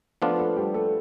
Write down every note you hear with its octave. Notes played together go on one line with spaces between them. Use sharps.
F3 A3 B3 D4 F4 A4
A3 A4
G3 G4
A3 A4